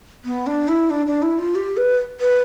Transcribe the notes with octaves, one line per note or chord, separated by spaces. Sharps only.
B3
D4
E4
D4
D4
E4
F4
G4
B4
B4